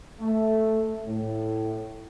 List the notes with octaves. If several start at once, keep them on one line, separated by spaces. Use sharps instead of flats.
A3
A2